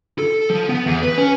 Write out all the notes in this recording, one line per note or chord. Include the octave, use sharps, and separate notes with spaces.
A4
F3
B3
E2
B4
C#4